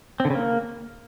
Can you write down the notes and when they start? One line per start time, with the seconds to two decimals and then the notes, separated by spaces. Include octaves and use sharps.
0.20 C4
0.25 D3
0.30 C#3
0.35 A#3